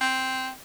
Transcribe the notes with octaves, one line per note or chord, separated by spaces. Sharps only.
C4